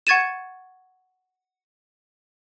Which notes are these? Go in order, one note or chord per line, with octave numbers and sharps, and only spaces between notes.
F#5 C#6 G#6 A6 D#7 E7